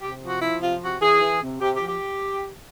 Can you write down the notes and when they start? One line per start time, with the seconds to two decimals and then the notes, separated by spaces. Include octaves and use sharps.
0.01 C3 G4
0.21 F3
0.27 F#4
0.40 F3 E4
0.60 C3 F4
0.81 C3 F#4
1.00 E3 G#4
1.20 E3
1.41 C3
1.60 C3 G4
1.74 G4
1.80 F3
1.87 G4